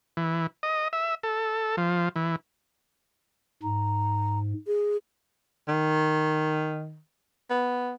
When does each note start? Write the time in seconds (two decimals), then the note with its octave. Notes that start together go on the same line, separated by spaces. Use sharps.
0.17 E3
0.63 D#5
0.93 E5
1.23 A4
1.77 F3
2.16 E3
3.63 G#2 A#5
4.67 G#4
5.68 D#3
7.50 B3